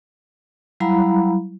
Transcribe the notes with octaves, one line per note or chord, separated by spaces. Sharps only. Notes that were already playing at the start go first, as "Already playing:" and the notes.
F#3 G3 E4 F5 A#5 B5